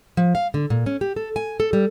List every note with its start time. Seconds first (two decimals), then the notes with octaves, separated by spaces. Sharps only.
0.17 F3
0.35 F5
0.54 D3
0.70 A#2
0.86 C#4
1.01 G4
1.16 A4
1.36 G#5
1.60 A4
1.73 G3